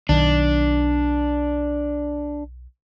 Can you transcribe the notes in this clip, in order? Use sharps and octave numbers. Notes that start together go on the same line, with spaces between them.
B1 D#3 D4